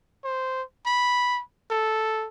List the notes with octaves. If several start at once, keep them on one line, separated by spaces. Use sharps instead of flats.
C5
B5
A4